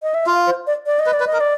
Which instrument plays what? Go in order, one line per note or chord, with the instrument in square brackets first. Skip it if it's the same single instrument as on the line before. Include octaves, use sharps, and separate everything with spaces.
[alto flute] D#5
E5
[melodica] F4 [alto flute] F5
[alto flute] C5
D5
D5
D#5
[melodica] B4
[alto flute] D5
[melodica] B4
[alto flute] D#5
[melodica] A#4
[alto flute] D5